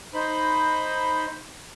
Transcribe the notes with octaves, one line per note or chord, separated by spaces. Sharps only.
D#4 C5 B5